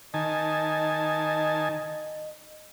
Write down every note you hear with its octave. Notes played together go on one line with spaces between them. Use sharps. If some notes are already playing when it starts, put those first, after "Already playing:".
D#3 D#5 G#5 A5